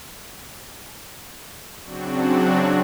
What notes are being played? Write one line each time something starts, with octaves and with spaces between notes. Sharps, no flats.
C#3 F#3 C4 D4 F#4